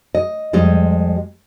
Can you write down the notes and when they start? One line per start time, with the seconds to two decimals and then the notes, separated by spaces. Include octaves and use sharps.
0.15 D#5
0.53 F2 G3 G#3 D#5